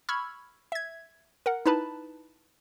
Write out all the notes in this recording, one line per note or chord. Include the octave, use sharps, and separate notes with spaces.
B5 C#6 E6 F6 G#6
E5 G#6
A#4 F#5
D#4 E4 B4 A5 B5